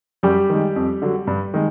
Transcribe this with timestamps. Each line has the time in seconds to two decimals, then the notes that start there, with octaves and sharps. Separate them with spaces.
0.23 F#2 G3 G4
0.50 D#3 G#3
0.76 F2
1.02 D3 F#3
1.27 G2
1.54 D#3 G#3